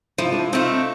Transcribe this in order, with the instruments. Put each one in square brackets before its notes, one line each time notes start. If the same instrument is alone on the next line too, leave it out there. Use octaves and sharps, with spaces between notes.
[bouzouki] F3 [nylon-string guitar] E4
[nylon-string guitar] D#4
D4 E4
[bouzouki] A3 C4 [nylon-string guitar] D#4 F4